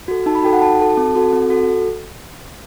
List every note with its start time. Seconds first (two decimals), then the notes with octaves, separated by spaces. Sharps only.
0.08 F#4 A4
0.26 D#4 A5
0.35 B5
0.43 F#4 A4 G5
0.53 F#5
0.62 D#4 A5
0.80 F#4 A4
0.97 C4
1.16 F#4 A4
1.33 C4
1.50 F#4 A4